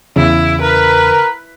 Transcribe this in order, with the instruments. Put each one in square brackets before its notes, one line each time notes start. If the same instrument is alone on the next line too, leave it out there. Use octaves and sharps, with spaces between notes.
[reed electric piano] E2 C#3 [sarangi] E4
[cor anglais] A#4 [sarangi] B4